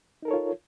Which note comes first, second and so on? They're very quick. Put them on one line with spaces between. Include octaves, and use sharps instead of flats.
D#4 A#4 A4 C#5 F4